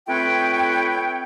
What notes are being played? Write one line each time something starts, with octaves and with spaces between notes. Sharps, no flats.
A3 C4 F4 B4 C#5 G5